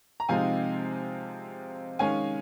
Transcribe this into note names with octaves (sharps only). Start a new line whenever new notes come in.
A#5
C3 F3 G#3 C4 D#4 F5 G#5
D#3 G#3 C#4 F5 G#5